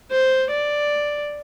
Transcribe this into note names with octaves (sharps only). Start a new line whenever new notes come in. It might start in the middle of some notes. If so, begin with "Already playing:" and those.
C5
D5